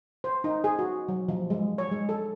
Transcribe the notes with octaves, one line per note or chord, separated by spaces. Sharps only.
C5
D#4
G#4
F#4
F#3
F3
G#3
C#5
G#3
A4